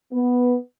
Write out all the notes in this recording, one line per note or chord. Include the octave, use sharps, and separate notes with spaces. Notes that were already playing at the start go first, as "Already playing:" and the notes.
B3